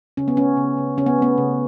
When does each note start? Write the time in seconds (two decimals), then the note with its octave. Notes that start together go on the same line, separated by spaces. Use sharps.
0.17 C#3 C#4
0.28 B3
0.37 A3 C#4
0.57 C#3
0.78 C#3
0.97 C#3 C#4
1.06 B3
1.18 A3 B3
1.38 C#3